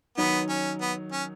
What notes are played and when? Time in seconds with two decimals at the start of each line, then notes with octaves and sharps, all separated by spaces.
0.17 D#3 F#3 B3 D#4
0.49 C#4
0.81 B3
1.12 C#4